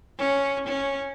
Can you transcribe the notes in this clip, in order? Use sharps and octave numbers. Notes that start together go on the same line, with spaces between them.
C#4
C#4